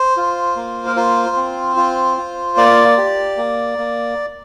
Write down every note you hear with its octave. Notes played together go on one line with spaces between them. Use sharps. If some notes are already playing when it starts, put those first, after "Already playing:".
Already playing: C5
F4
A#3
A#4
F4 C5
C4
F4
F4
A#3 D5
G4
A#3
A#3